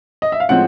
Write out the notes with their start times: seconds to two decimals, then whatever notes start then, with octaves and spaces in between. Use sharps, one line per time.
0.22 D#5
0.32 E5
0.40 F5
0.49 A2 F3 G#3 C4 F#5